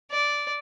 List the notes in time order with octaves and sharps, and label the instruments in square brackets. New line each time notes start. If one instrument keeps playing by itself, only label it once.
[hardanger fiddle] D5